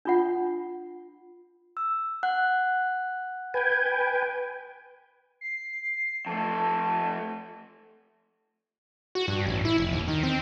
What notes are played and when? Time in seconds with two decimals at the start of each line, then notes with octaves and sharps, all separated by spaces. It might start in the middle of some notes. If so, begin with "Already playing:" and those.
0.05 D4 F4 F#5
1.77 E6
2.23 F#5 F#6
3.54 B4 G5 G#5
5.41 C7
6.26 F2 A3 A5
9.15 F#4
9.28 G2
9.46 A1
9.65 E4
9.78 F1
9.92 D#2
10.08 D#3
10.23 C4